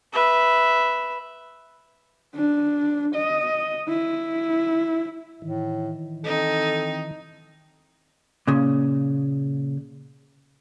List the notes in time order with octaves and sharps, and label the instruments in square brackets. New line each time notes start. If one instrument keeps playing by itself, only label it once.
[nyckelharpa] B4 E5
[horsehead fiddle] D4
D#5
E4
[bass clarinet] A2 [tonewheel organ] D#3 E3
[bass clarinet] C4 [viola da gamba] D#4 [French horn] A4
[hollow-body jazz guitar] A#2 C#3